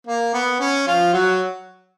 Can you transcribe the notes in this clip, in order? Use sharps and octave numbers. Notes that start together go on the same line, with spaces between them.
A#3
B3
C#4
F3 F4
F#3 F#4